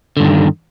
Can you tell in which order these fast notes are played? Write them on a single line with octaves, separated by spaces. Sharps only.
D3 G2 D#3